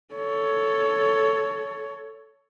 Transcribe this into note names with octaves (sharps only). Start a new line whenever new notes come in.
A4 C#5